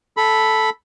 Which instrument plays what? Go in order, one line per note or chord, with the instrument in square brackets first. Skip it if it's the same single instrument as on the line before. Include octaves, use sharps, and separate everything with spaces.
[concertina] A4 B5